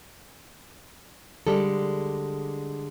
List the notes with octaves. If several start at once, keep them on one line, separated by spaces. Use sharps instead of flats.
D3 G3 G#3 A4